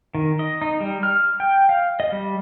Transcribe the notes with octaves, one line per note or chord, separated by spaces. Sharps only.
D#3
D#5
D#4
G3
F6
G5
F5
D#5
G3